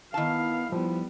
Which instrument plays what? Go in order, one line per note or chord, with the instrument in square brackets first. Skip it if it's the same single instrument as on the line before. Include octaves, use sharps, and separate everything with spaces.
[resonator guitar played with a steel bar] D#3 A5 [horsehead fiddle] B3 F5 [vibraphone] D#4 E4 B5
[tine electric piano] F3 [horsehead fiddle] G3 B3